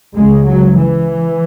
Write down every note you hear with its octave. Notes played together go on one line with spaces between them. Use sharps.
C#2 C#3 G#3
F#3
E3